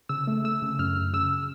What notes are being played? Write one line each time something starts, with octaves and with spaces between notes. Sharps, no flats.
C#3 E6
A3
A3 E6
C#3
F#2 F6
F#2
C#3 E6